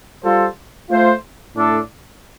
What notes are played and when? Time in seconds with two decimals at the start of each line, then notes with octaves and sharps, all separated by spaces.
0.23 G3 F4 A4 C5
0.90 A3 F4 C5
1.55 A2 A3 D4 A4